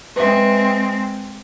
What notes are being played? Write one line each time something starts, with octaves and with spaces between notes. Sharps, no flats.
G#3 C4 B4 E5